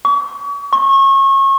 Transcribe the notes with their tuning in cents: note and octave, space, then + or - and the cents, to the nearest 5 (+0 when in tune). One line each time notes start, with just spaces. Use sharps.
C#6 +40
C#6 -30